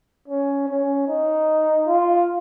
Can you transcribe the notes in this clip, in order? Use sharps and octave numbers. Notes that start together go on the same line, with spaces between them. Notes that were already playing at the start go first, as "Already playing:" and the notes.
C#4
C#4
D#4
F4